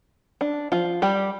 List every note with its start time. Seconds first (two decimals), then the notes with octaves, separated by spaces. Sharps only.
0.41 D4
0.72 F3 F4
1.02 G3 G4